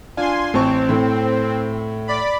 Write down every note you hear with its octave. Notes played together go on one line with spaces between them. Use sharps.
D4 F4 G#5 C6
A1 C4 A5 C#6
A2 A3
D5 B5